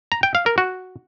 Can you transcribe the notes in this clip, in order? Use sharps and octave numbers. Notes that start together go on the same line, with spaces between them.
A#5
G5
F5
A#4
F#4